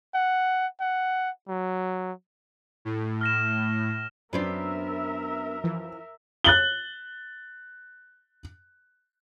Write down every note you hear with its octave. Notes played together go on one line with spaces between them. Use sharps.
F#5
F#5
F#3
A2
F6 A#6 E7
F#2 B3 C4 D4 A#4 E5
E3 F3
F#6 A6 F#7 G7